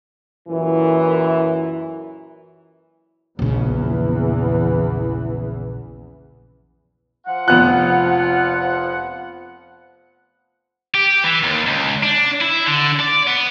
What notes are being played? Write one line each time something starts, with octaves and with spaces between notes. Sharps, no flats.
F#2 A#2 E3
A#1 E2 C#3 E3
F3 F#5
F1 B3 F4 F#6
G4
E3
D#2
C#2
D4
E4
D3
D5
B3